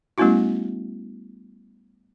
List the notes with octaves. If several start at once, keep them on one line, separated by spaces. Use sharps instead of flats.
G3 A3 B3 C#4 E4 F#4